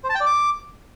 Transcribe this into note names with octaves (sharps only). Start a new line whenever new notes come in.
C5
A5
G5
D5
D6